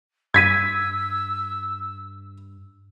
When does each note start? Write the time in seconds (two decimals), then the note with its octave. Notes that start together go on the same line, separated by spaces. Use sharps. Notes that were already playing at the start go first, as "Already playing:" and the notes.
0.34 G2 E6 G#6 B6 D#7